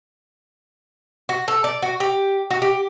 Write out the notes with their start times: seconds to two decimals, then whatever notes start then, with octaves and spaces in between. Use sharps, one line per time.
1.29 F#4
1.48 A4
1.64 D5
1.82 F#4
2.00 G4
2.51 F#4
2.62 G4